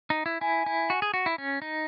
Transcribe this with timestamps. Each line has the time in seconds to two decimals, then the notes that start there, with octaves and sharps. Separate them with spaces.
0.10 D#4
0.26 E4
0.41 E4 G#5
0.66 E4
0.90 F#4
1.02 G#4
1.14 F#4
1.26 E4
1.38 C#4
1.62 D#4